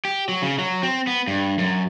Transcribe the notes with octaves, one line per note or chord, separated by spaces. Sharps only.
G4
F#3
C#3
F#3
C4
B3
G2
F#2